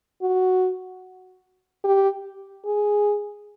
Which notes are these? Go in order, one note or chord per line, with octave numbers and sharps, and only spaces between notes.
F#4
G4
G#4